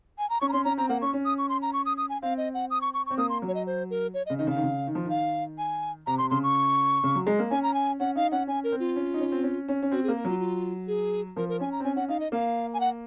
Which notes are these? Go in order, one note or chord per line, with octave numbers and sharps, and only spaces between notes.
G#5
A#5
C#4 C#6
A#5
C#4 C6
C#4 A#5
C4 A#5
A#3 F#5
C#4 C#6
C#4
D#6
C#6
C6
A#5
C#6
D#6
D#6
G#5
C4 F5
D#5
F#5
D#6
C#6
C#6
C#6
C4
A#3 D#6
C6
F#3
C#5
D#5
C5
A#4
C#5
D#5
C#3
D#3 D#5
C#3 F5
D#3
C#3
D#3
F3
D#3 F5
G#5
C3 A#5
C3 C6
C#3 C6
C#6
C#3
F#3
G#3
A#3
C#4 G#5
A#5
G#5
C#4 F#5
D#4 F5
C#4 F#5
C#4 G#5
A#4
C4
F4
C#4
D#4
C#4
C4
C#4
C#4
C#4
C4 F#4
G#4
A#3
A#4
F#3 F4
F4
G#4
F3 A#4
A#4
C#4 G#5
A#5
C4
C#4 G#5
C#4 F#5
D#4 F5
D#5
A#3 F5
G#5
F#5